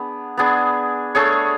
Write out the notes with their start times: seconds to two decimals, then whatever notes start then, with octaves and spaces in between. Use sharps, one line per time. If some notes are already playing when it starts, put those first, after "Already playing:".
Already playing: B3 D4 G#4
0.37 B3 D4 G#4
1.15 A3 D4 G#4 C#5